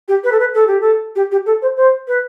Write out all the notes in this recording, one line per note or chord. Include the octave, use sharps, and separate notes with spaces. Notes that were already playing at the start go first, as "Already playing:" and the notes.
G4
B4
A4
B4
A4
G4
A4
G4
G4
A4
C5
C5
B4